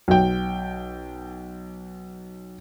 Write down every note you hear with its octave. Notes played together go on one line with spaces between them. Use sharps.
B1 G5